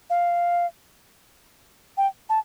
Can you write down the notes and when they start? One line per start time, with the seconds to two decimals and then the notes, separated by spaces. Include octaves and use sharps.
0.10 F5
1.97 G5
2.29 A5